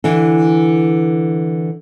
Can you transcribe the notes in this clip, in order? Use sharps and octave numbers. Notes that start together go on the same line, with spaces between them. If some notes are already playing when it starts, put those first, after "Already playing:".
D3 E3